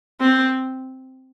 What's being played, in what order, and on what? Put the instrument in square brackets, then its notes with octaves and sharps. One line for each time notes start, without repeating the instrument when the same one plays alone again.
[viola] C4